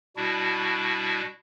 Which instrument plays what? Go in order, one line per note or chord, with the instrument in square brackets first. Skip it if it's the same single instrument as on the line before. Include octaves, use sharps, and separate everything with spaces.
[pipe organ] B2 G3 D4 E4 F#4